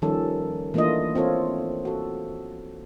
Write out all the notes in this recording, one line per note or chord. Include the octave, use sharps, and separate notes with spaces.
D#3 F3 G3 C#4 A4
E3 A3 A#3 D4 F4 D#5
C4 F4 A4 C#5
F#4 A4